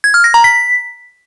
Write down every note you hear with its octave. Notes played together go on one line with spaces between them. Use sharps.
G#6
F6
A#6
A#5
B6